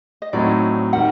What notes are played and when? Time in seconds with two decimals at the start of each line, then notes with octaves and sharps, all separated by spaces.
0.22 D#5
0.33 A2 F#3 C4 D#4 D5
0.93 D#3 G3 F#5